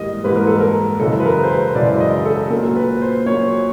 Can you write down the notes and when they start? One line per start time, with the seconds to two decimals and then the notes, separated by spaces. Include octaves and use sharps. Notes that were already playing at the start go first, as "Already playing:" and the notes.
Already playing: G#2 E3 G3 A#3 D#5
0.24 G#2 E3 G3 A#3 B4
0.36 A#4
0.47 A4
0.60 A#4
1.00 F#2 C#3 E3 G#3 A4
1.20 B4
1.25 A#4
1.43 C5
1.50 B4
1.75 F#2 C#3 E3 G#3 D5
2.00 D#5
2.25 A4
2.50 A#2 F#3 A#3 A#4
2.76 B4
3.02 C5
3.26 A#2 F#3 A#3 C#5